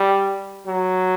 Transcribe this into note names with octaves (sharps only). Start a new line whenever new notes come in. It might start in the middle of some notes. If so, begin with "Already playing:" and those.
Already playing: G3
F#3